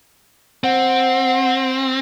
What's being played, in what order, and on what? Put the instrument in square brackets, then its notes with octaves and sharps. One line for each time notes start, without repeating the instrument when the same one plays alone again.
[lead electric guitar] C4 [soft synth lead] F#5